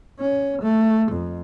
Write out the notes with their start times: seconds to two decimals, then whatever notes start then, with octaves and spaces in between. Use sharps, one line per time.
0.19 C#4
0.62 A3
1.12 F2